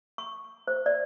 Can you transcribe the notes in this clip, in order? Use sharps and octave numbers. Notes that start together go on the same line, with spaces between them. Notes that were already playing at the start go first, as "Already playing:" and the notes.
C#6
C5
D5